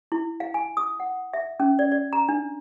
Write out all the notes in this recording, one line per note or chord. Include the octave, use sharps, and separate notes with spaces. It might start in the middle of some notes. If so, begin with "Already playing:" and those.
E4
F5
G#5
D#6
F#5
E5
C#4
D5
D5
A#5
D4